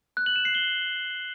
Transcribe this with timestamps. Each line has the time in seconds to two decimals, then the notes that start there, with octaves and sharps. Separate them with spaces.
0.17 F#6
0.26 F#7
0.36 E7
0.45 C7
0.55 G7